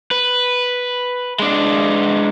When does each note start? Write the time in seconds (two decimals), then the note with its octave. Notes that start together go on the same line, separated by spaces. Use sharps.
0.11 B4
1.39 G#3 D4